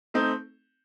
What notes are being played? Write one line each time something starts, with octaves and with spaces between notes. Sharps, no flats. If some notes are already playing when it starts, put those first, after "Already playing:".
A3 C4 D#4